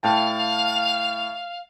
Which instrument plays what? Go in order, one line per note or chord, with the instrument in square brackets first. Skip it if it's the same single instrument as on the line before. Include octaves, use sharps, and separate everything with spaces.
[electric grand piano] A2 G5 A5 [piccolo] F5